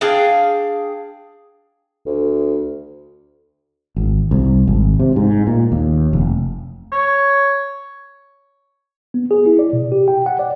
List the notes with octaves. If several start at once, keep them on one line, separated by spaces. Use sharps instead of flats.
D4 G#4 F5 G5
D2
G#1
C2
G#1
C3
G#2
A#2
D#2
F1
C#5
B3
G#4
E4
D5
B2
G4
G5
F#5
D5